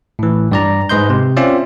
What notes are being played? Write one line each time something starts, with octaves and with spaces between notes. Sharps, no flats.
A2 E3
G2 D5 A#5
G#2 B4 D#5 C6 G6
C3
C4 C#4 F4 D5 E5